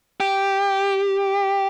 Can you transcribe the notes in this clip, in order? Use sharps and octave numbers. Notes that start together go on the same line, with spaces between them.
G4